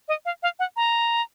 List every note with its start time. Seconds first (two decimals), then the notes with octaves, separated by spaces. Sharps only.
0.08 D#5
0.25 F5
0.43 F5
0.59 F#5
0.76 A#5